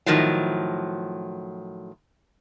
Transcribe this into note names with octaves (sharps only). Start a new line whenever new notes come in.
A2 D#3 F3 F#3